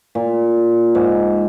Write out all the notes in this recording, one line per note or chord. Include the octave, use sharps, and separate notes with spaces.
A#2
G#2